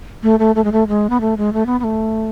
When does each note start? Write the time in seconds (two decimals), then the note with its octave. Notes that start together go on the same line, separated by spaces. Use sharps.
0.23 A3
0.39 A3
0.55 A3
0.64 G#3
0.72 A3
0.88 G#3
1.10 B3
1.21 A3
1.37 G#3
1.53 A3
1.66 B3
1.80 B3
1.84 A3